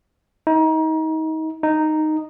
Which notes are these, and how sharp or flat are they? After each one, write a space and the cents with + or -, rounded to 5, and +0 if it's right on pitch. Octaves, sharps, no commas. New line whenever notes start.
D#4 +30
D#4 -5